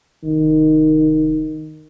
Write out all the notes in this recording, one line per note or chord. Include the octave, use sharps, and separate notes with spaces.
F1 D#3